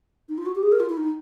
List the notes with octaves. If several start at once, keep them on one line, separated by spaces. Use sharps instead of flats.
D#4
F4
F#4
G4
G#4
A#4
F4
E4
D#4